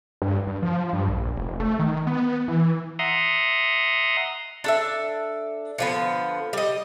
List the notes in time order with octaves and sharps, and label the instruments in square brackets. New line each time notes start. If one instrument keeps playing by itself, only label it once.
[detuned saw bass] G2
G2
F3
G2
A#1
F1
A3
D#3
B3
E3
[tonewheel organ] E5 F#5 A#5 C6 D#6
[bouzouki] D4 A4 E5
D3 F3 B3
G3 D#5